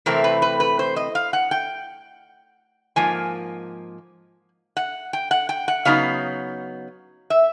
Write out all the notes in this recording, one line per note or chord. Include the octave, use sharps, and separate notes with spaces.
C3 E3 A3 C4 A#4
B4
B4
B4
C5
D#5
F5
F#5
G5
G#2 F3 A#3 G#5
F#5
G5
F#5
G5
F#5
C#3 F#3 B3 D#4 F5
E5